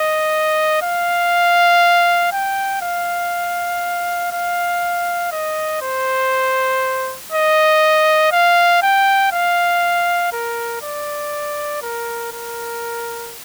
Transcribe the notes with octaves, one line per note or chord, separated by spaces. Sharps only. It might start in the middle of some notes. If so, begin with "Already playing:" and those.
Already playing: D#5
F5
G5
F5
F5
D#5
C5
D#5
F5
G5
F5
A#4
D5
A#4
A#4